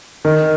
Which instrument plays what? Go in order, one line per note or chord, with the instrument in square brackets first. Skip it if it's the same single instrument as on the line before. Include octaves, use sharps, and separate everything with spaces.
[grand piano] D#3